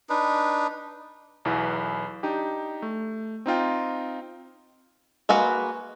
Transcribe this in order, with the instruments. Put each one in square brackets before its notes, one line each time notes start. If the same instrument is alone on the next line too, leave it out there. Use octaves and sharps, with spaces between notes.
[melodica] D4 D#4 B4
[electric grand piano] B1 E2 E4 B4
D4 D#4 G4
A3
C4 D#4 F4 G5
[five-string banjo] G#3 A#3 F#4 B4